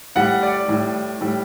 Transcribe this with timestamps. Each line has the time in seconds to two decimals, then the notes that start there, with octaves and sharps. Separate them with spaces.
0.15 A2 G3 F#5
0.43 D5
0.68 A2 G3
1.21 A2 G3